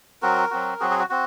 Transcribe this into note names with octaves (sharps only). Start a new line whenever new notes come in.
F#3 C4 F#4 A#4
F#3 C4 F#4
F#3 C4 F#4 G#4
G#4
F#4
C4 F#4